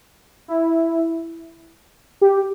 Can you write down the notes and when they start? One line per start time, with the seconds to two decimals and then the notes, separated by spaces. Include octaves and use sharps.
0.48 E4
2.21 G4